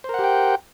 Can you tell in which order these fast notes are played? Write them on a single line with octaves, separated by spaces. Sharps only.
C5 A#4 F#5 G4 G5